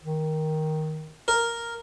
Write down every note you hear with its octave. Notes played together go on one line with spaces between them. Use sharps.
D#3
A#4